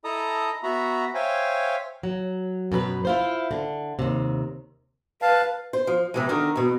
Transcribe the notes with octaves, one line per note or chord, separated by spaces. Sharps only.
E4 A4 D#5 A5 A#5 D#6
B3 F#4 E5 A#5 B5
C5 C#5 E5 F5 G5 G#5
F#3
F#2 B2 A4 B4
E4 F4 C5
D3
D#2 C3
B4 F5 A5
C5
F3
C3 E3 G#3
D3 D#3 A#4
E2 B2